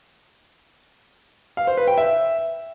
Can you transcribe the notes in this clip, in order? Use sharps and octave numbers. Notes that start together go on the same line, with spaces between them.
F5
C5
B4
G5
E5